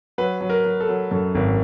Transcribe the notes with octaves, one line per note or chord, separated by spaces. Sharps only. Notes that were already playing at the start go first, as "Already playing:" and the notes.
F#3 B4
F#3
A#4
F#3
A4
F#3
F#2 A4
G#1